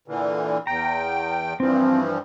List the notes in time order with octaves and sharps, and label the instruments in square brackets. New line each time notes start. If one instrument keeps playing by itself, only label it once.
[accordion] A#2 D3 E3
[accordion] E2 G5 [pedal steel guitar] A#5
[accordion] G2 E3 F3 [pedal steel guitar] C4